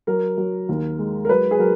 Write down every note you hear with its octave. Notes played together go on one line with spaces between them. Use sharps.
F#3 A#4
F#3
D#2
G#3
A#4
F#3 B4
G#4
F#3 A#4